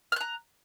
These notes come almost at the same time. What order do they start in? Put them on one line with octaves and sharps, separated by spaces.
F6 F#6 A#5